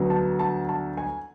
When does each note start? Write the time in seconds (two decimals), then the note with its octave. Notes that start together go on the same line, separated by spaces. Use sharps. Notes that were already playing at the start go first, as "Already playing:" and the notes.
Already playing: D2 D3 F#3 B3
0.10 A5
0.39 A5
0.69 A5
0.97 G#5